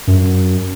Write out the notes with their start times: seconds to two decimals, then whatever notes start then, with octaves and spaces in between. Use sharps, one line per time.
0.07 F#2